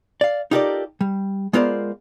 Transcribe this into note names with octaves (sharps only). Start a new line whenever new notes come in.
D5 F5
D#4 F4 G4 A4 A#4 D5
G3
G#3 B3 F4 A#4 C5 D5